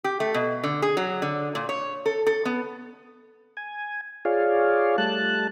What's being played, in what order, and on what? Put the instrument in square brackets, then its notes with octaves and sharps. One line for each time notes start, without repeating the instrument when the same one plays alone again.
[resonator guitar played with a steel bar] G4
A3
B2
D3
G#4
F#3
D3
A#2
C#5
A4
A4
B3
[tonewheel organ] G#5
F4 G#4 C#5 D5 F5
G3 A3 A5 F#6